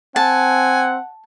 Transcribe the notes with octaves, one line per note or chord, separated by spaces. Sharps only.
C4 F#5 G#5 A5